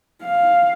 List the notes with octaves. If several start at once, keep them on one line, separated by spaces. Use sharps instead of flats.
F5